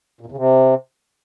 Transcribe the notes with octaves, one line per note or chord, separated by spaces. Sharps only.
A#2
E2
C#3
C3